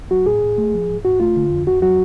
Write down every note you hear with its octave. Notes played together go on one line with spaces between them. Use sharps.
F#3 F#4
A2 G#4
A2
A3
F3
G#2
G#2 F#4
A3 F4
D3
F2
F2 F#4
F#3 F#4